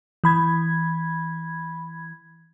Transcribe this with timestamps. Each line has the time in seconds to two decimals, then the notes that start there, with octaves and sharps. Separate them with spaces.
0.24 E3 B5 G#6